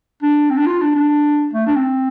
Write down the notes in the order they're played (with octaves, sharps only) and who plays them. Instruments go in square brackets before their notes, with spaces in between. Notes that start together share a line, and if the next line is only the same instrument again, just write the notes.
[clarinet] D4
C4
D4
F4
D4
D4
A3
D4
C4